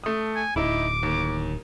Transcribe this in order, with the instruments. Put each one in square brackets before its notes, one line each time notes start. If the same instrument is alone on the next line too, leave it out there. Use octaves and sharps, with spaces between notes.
[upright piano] A3 D#6
[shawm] G#5
[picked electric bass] D1 [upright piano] D#4 E4 [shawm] D6
[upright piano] D#2